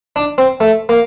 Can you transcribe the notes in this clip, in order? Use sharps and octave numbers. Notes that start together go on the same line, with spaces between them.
D4
C4
A3
A#3